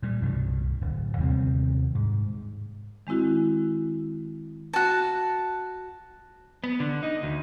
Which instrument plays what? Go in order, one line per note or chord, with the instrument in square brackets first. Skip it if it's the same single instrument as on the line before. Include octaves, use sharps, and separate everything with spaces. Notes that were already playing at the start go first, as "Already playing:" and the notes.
[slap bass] A#2 G3
C2 G2 B2 G3
D1
D#2 C3 G3 C4
G#2
[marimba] D#3 G#3 C4 E4 F#4
[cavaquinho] F#4 A5
[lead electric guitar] B3
D3
D#4
D2